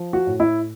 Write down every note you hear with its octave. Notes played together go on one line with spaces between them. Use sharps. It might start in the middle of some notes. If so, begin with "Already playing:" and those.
Already playing: F3
F#4
A2
E4